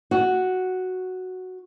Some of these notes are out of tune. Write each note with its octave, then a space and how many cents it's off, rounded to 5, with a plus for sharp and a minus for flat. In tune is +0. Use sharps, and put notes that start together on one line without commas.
F#4 +0